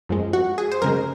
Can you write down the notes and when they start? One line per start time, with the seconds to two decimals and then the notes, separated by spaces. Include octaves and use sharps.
0.09 F#2 F3 G#3
0.33 F#4
0.58 G#4
0.72 C5
0.82 F#2 C#3 G#3 A#4